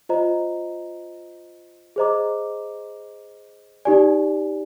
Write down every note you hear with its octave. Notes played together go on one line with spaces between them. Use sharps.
F4 C5 D#5 A#5
G#4 C5 D#5 A#5 D6
D#4 G4 D5 G#5